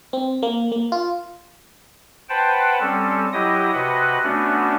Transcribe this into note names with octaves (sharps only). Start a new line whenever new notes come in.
C4
A#3
A#3
F4
B4 C5 F#5 G5 A5
G3 C4 C#4 A4
F#3 E4 G4 D#5 D#6
C3 F#4 B4 D#5 F#5
A3 B3 C#4 D4 F#4